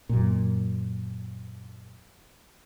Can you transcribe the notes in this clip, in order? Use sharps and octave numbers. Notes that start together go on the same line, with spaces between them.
F#2 A#2